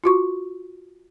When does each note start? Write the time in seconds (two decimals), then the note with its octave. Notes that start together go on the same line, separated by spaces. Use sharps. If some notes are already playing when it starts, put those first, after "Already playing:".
0.04 F4 F#4 C#6